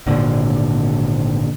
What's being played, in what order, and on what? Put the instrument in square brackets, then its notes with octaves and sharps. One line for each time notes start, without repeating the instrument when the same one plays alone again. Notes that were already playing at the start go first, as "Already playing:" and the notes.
[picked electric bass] G#1 A#2 D3